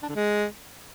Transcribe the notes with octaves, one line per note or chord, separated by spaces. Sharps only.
D4
D3
G#3